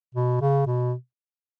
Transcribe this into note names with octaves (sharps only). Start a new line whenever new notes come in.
B2
C#3
B2